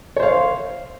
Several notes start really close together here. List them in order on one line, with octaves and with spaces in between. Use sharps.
C#5 C5 F5